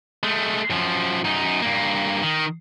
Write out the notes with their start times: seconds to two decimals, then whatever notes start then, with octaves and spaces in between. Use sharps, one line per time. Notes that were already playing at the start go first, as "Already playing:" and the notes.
0.23 G#3 A3
0.70 F#2 F3
1.24 F#2 D#4
1.62 G2 A#3
2.22 D#3